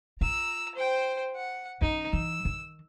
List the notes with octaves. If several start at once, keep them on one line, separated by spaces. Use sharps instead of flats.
F4 A#5 E6
C5 G5
F#5
D#3 C#4 D#4
E3 E6
D#3